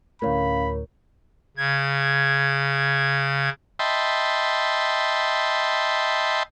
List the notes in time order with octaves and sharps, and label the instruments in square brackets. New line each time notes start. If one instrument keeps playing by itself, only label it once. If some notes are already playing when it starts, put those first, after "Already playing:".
[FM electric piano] D2 A2 [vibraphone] C#4 F5 [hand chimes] A#4 C#5 [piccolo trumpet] B5
[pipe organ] C#3 G#6
[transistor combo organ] D#5 E5 G5 A5 B5 C6